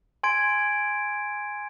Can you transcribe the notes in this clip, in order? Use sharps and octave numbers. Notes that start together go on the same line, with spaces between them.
G#5 C6 G#6 D7